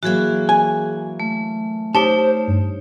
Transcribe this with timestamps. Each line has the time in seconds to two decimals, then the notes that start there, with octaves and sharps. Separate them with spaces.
0.03 E3 F#3 A#3 F#4 G#4
0.49 G#5
1.20 A3
1.95 A3 D#4 G4 C5 C#5 A5
2.48 G2